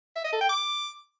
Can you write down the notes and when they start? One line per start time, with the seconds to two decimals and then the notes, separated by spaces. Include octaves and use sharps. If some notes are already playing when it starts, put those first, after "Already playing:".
0.16 E5
0.24 D#5
0.32 A4
0.41 G5
0.49 D6